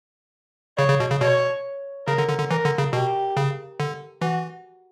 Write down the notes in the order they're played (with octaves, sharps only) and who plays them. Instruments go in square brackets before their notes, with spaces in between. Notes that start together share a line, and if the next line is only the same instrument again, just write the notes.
[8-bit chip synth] C#3 [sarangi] C#5
[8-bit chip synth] C#3
B2
C#3
[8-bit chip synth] B2 [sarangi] C#5
[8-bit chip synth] C#3 [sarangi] A#4
[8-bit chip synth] D3
D3
D3
[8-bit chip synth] E3 [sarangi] A#4
[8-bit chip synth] D3
C#3
[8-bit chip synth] B2 [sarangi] G4
[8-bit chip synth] C#3
D3
[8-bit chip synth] E3 [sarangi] F#4